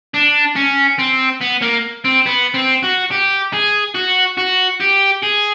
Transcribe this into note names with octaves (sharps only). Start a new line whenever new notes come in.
D4
C#4
C4
B3
A#3
C4
B3
C4
F#4
G4
G#4
F#4
F#4
G4
G#4